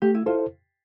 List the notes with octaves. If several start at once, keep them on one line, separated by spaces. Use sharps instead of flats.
A3 G4
E4
E4 F4 A4 C5